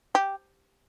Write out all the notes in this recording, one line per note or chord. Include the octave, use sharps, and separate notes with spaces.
G4